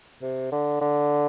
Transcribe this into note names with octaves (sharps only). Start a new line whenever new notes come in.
C3
D3
D3